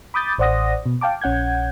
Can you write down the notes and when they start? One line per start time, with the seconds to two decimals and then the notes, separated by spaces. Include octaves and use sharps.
0.14 B5 D6 D#6 G6 A6
0.38 A1 C5 D5 F#5 D#6 A#6
0.86 B2
1.01 F5 G5 A5 D6
1.21 A#1 C#4 F#5 G6 G#6